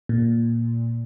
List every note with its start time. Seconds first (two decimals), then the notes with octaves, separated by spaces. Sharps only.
0.09 A#2